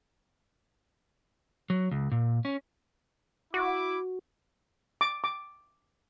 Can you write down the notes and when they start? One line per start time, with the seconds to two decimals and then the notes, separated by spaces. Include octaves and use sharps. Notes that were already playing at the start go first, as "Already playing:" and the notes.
1.70 F#3
1.91 C#2
2.12 A#2
2.45 C#4
3.54 E4 F#4 D6
5.01 D6
5.24 D6